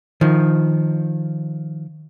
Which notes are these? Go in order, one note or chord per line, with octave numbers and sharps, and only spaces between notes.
D#3 F3